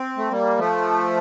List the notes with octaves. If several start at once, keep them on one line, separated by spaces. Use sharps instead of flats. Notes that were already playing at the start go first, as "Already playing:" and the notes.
Already playing: C4
A3
G3 A#3
F3 A3